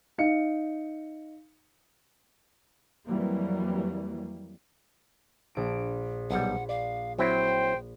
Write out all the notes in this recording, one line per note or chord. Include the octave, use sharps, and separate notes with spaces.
D#4 F5 C#7
F2 E3 F#3 G3 A#3
A#1 D7
B1 G3 F#5
D5 F5
F#3 C4 E4 C5 G5